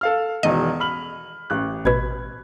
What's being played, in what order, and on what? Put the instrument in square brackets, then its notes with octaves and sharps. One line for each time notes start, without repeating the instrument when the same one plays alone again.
[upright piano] A4 F5 F6
[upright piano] E1 E2 D#3 [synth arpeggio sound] D#5
[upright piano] B5 F6 F#7
A1 F#6
[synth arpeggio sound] A1 B2 [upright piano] B5 G#6